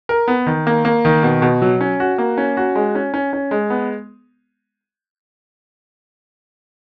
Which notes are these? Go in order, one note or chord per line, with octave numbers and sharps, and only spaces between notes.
A#4
B3
D#3
A#3
A#3
D#3
B2
B2
F#3
C#4
F#4
A#3
C#4
F#4
G#3
C#4
C#4
C#4
G#3
B3